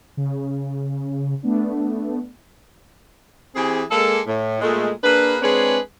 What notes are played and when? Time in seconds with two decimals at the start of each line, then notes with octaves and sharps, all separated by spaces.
0.17 C#3
1.43 A3 B3 D4
3.55 E3 C4 G4 G#4
3.90 G#3 A#3 A4
4.27 A2
4.62 A#2 G#3 A3
5.03 A#3 D4 G#4 B4
5.41 G#3 C4 D4 G#4 B4 C#5